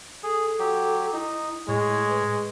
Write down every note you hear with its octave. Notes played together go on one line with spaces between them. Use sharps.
G#4 A4
F#3 G4
D#4 E4
A2 G#3 C#5
B4